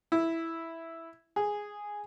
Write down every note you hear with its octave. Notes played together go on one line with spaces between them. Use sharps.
E4
G#4